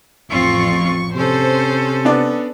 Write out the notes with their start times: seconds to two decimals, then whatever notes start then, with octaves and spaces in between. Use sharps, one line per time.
0.30 A1 F2 C4 F4 C#6
1.15 C3 C#4 A4 C5
2.05 B3 D4 D5